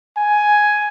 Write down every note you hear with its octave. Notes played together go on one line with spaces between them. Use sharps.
G#5